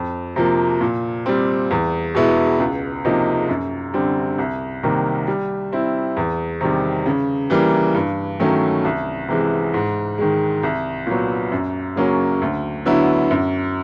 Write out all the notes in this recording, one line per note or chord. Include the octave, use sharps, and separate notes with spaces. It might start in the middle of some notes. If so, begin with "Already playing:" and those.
Already playing: F2
C3 F3 A#3
A#2
G3 C4
E2
B2 G#3 B3 E4
C#2
C3 F3 A#3 D#4
F#2
D3 G3 C4
C2
C3 D#3 G3 A#3
G3
C4 E4
E2
C3 D#3 G3
C#3
E3 G3 A#3
G2
D#3 F#3 A3 C#4
C2
C3 E3 G#3
G#2
D#3 G#3
C2
A#2 F#3 B3
F#2
C#3 F#3 A#3 C#4
D2
D3 F#3 B3 E4
F#2